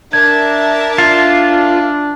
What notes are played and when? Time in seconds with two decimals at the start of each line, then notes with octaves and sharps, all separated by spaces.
0.13 D4 A#4 E5 A5 G#6
0.98 F4